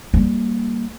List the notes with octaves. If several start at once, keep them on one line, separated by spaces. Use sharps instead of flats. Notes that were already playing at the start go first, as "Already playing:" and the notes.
G3 A#3